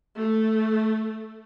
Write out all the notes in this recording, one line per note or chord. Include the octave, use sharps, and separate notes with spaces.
A3